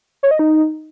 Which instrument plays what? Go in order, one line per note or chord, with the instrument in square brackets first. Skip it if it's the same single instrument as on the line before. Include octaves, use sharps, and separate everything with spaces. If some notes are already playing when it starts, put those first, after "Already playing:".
[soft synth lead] C#5
D#5
D#4